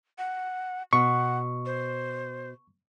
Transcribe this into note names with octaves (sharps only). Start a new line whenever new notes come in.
F#5
B2 F#5 C#6
C5